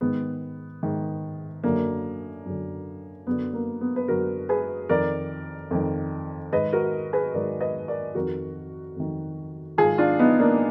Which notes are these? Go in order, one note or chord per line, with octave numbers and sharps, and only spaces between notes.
G#2 D#3 B3
G#2 D#3
F#2 D3 A#3
F#2 D3
F#2 D3 B3
A#3
B3
B4
F#2 D3 F#4 A#4
G#4 B4
F2 D#3 A#4 D5
F2 D#3
G#2 D#3 B4 D#5
F#4 A#4
G#4 B4
G#2 D#3 A#4 D5
B4 D#5
A#4 D5
F2 D#3 F#4 A#4
F2 D#3
G#2 D#3 F4 G#4
D4 F4
B3 D#4
A#3 D4